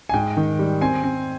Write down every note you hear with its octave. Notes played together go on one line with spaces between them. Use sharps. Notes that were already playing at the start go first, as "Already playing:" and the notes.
G#5
G#2 G5
D#3
G3
C4 G#5
C4